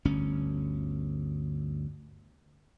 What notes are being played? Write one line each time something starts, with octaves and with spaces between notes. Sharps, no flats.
G1 D2 C#4